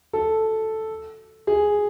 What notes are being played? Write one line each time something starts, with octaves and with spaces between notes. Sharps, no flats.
A4
G#4